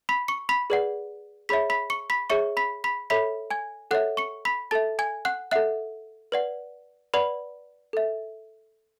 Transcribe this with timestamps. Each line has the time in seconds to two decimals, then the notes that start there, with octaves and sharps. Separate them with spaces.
0.09 B5 B6
0.28 C#6 C#7
0.49 B5 B6
0.70 G#4 B4 D5 F#5
1.49 G#4 C#5 E5 B5 B6
1.70 B5 B6
1.90 C#6 C#7
2.10 B5 B6
2.30 G#4 C#5 E5 C#6 C#7
2.57 B5 B6
2.84 B5 B6
3.10 A4 C#5 E5 B5 B6
3.51 G#5 G#6
3.91 A4 C#5 E5 F#5 F#6
4.17 C#6 C#7
4.45 B5 B6
4.71 A4 E5 A5 A6
4.99 G#5 G#6
5.25 F#5 F#6
5.51 A4 E5 F#5 F#6
6.32 B4 D5 F#5
7.14 B4 D5 F#5 B5
7.93 A4 E5